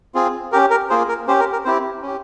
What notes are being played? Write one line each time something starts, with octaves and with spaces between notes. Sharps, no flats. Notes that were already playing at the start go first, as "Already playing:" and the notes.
C4 F4 G#4
C#4 G4 A#4
A#4
A#3 F4 G#4 C5
A#4
C#4 G4 C5
A#4
A#4
C4 E4 G4 C5
C#4 G4